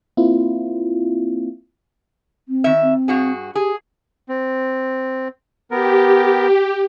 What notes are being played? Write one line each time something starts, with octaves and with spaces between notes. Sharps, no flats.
A#3 C4 E4 F4
C4
D#3 E5
C4
G2 F#4 G#4
G4 G#4
C4
B3 G4 A#4